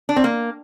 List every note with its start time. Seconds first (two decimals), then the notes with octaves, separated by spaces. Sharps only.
0.09 D4
0.16 C4
0.24 A#3